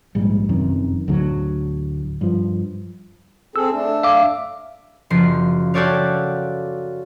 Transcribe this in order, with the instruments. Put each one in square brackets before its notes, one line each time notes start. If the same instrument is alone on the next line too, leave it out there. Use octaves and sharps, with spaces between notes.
[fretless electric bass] A#1 G#2 G3
F1 F#2 C3 D#3
D2 A2 D3 F#3
G2 F3
[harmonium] C4 G#4 A4 [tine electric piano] E6
[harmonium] A3 D4
[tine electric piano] E5 F5 D6
[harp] F#1 F3 C7
F#4 G4 A4 C#5 D5 F5